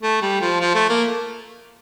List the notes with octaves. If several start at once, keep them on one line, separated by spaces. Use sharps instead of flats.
A3
G3
F3
F3
A3
A#3